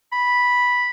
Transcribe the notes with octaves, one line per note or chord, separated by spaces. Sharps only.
B5